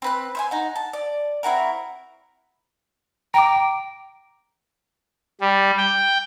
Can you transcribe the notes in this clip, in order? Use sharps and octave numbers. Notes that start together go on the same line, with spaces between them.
C4 B4 F#6
C5 E5 G#5
D#4 F#5
A5
D5
C4 E4 F#4 A#4
G5 A#5 D6
G3
G5